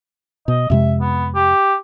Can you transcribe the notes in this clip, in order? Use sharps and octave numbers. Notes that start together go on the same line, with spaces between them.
B2 D#5
F2 C3 G#3 E5
B3
G4